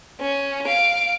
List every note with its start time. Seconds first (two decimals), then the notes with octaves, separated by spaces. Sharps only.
0.21 C#4
0.66 F5 D7